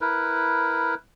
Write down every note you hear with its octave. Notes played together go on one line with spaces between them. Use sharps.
E4 A#4 B4